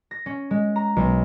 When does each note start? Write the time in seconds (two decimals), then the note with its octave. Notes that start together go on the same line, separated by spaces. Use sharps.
0.11 A#6
0.26 C#4
0.51 G#3
0.76 A#5
0.96 B1